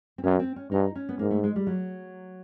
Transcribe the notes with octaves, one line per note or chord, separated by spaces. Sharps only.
C4
F#2 C#4
C4
C#4
G2 D#4
C#4
B3
G#2 A#3
A3
G#3
G3
F#3